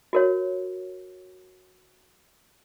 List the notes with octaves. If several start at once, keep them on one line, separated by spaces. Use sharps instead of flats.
F#4 A#4 C#5